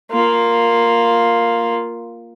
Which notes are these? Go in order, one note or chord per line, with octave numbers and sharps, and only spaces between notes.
A#3 F4